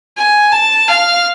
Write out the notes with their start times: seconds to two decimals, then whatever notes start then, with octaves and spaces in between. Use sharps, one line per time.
0.17 G#5
0.52 A5
0.88 F5